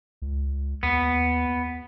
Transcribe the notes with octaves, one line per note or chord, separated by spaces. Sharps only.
C#2
D#2 B3